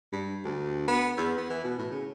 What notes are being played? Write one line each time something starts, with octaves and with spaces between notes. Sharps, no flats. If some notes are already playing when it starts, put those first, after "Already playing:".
G2
D2
B3
E2
B3
E3
B2
A2
C#3